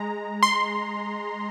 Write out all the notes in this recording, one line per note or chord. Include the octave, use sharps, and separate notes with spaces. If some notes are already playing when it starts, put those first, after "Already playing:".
Already playing: G#3 A#5
C6